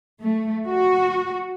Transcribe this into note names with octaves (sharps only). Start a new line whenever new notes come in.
A3
F#4